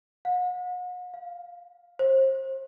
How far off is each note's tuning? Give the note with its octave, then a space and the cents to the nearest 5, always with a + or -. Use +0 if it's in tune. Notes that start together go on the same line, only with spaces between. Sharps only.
F#5 -40
F5 +5
C5 +30